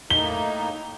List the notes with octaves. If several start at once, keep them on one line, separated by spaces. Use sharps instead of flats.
A2 A#3 D#4 G7